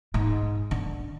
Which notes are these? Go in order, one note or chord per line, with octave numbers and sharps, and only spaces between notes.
G#2
D3